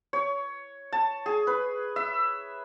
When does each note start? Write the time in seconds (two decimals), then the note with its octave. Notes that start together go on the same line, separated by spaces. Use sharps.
0.13 C#5
0.92 A5
1.26 G#4
1.47 B4
1.96 E5